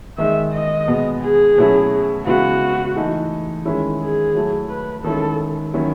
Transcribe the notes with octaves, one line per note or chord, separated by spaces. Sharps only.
D#3 G#3 D#4 E5
D#5
B2 G#3 B3
G#4
B2 F#3 A3 C#4 E4
C#3 G#3 B3 E4 F#4
E3 A3 D#4
D#3 G#3 C#4 E4
G#4
F#3 A3 E4
B4
D#3 G#3 C#4 E4 A4
D#3 F#3 C#4 E4